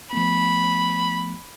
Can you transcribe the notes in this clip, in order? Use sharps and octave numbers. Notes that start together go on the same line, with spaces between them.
F3 A3 B3 B5